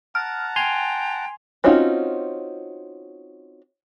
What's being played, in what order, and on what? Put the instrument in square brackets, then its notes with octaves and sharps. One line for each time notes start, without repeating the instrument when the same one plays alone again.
[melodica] F#5 A5 A#5 [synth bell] F6
[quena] G5 [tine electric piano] G#5 C6 [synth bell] F7
[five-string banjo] C4 C#4 D#4 F4 F#4